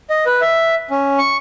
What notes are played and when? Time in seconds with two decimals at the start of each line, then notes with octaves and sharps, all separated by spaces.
0.10 D#5
0.26 B4
0.41 E5
0.91 C#4
1.18 C#6